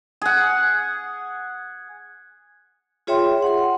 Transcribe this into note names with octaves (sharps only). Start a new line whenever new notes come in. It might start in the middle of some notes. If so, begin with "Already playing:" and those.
G#4 F#5
F4 G#4 C#5 E5 G5 C6
F#5 C6